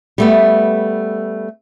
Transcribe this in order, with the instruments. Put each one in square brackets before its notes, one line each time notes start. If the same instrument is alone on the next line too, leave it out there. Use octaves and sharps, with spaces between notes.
[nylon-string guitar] G3 A3 B3